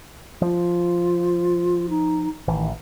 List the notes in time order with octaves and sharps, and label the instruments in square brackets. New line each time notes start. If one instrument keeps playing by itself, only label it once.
[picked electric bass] F3 [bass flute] F4
[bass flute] D#4
[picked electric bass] A1 E3 [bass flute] D#3